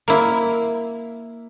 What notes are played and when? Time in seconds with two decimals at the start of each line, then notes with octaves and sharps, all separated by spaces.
0.08 A#3 E4